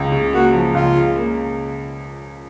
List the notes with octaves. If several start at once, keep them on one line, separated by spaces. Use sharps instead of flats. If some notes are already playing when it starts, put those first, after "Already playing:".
Already playing: C#2
C#3
A#3 F#4
F3
C#2 F4
C#3
A#3